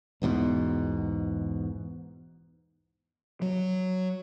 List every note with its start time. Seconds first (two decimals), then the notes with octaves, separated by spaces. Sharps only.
0.22 B1 E2 G#2 B2
3.42 F#3